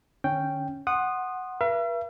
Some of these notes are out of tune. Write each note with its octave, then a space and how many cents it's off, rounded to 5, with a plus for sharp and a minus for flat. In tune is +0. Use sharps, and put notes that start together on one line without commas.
D3 +40 C#4 +0 G5 +0
F#5 +0 C6 +20 D#6 -15
B4 -40 E5 +45